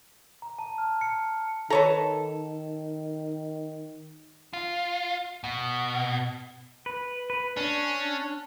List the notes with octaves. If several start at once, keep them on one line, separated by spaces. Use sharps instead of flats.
A#5
A5
F6
C#7
D#3 A4 B4 C#5 A#5
F4
B2
B4
B4
C#4 D4